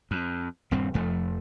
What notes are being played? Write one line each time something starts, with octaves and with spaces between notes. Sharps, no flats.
F2
D#1 G2 G3 C4
F1 F2 F3 A3